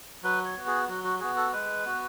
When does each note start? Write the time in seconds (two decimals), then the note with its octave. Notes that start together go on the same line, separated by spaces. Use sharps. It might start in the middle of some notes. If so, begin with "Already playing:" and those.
0.23 F#3 B4
0.45 C#5
0.57 B3 F#4
0.67 G#4
0.88 F#3 F#4
1.04 F#4
1.20 B3 F#4 G#4
1.36 A4
1.53 G#3 B4
1.85 B3 F#4